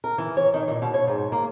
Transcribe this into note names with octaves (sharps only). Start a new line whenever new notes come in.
A#4
E3
C#5
D#3
A#2
B2
C#5
G#2
A#3